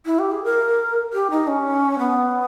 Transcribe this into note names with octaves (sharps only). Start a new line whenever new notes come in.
E4
G4
G#4
A#4
G4
D#4
C#4
B3